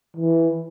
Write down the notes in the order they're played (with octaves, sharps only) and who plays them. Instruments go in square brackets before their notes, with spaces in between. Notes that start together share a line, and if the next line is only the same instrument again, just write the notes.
[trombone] E3